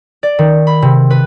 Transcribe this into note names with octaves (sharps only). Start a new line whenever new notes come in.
D5
D#3
B5
C3
B4